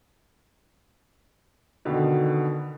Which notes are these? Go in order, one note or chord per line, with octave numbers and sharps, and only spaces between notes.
B2 D3 D#3